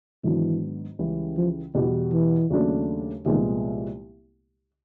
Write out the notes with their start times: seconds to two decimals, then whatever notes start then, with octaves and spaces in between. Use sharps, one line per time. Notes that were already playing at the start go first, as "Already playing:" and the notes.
0.24 G#2 D#3 E3 F#3 B3 D4
0.99 C#2 C#3 E3 G3
1.37 F3
1.74 E2 B2 E3 G3
2.12 E3
2.50 D#2 C#3 F#3 A3 D4
3.26 C2 A#2 D#3 F3 G#3 B3